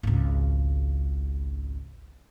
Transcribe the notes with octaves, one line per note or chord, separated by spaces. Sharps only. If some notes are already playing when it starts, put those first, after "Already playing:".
G#1 C#2